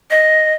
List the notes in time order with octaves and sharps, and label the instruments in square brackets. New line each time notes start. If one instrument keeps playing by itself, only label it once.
[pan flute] D#5